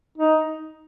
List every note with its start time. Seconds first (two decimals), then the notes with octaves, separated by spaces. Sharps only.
0.18 D#4